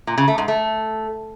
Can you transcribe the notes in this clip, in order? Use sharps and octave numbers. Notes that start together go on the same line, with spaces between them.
A#2
C#3
A3
G#2
A3